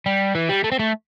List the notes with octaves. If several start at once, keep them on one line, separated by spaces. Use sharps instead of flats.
G3
E3
G3
A3
C4
A3